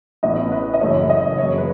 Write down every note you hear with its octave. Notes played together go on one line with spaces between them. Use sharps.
A1 A2 E3 B3 D#5
B4
D#5
F#1 F#2 E3 A3 C#4 C#5
D#5
F#2 C#3 E3 C#5
B4